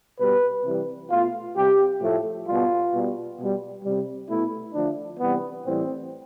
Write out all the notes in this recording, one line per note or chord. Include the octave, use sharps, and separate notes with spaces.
B2 G3 B4
C3 E3 G3
B2 A3 F4
C3 G3 G4
A2 F3 A3
B2 G3 F4
B2 G3
B2 G3
C3 G3
B2 A3 E4
D3 F3 A3 D4
C3 E3 G3 B3
A2 E3 G3 C4